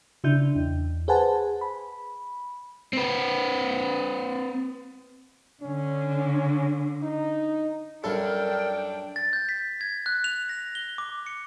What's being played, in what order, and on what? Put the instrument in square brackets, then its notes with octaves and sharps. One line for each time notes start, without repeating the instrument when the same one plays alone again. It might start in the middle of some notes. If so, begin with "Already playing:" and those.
[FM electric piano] C#3 D4 E4 G6
E2
G#4 B4 C5 F#5 G#5 A5
B5
[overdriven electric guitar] C4 B4
[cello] D3 [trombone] C#4
[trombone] D#4
[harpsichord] F#2 G3 F5 [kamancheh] D4 G5 [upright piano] A4 [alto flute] A#4
[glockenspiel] A6
G6
B6
G#6
F#6
F7
A#6
G7
D6
C#7